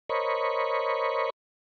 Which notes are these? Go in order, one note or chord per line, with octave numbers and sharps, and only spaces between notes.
A#4 C5 C#5 D#5 B5 C#6